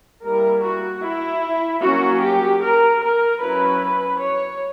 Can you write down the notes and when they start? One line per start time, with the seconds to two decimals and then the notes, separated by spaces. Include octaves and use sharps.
0.23 G3 A#3 E4 A#4
0.63 F#4
1.02 E4
1.82 F#3 A#3 C#4 F#4
2.22 G4
2.62 A#4
3.02 A#4
3.41 F#3 C#4 E4 B4
4.21 C#5